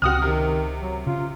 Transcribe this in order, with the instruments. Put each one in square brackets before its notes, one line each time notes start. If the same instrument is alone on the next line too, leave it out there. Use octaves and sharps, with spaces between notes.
[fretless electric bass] C#2 C#3 [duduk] C4 [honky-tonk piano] F#4 D#6 F6
[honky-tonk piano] C3 [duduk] D#3
[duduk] F#3
[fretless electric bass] C#3 [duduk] F4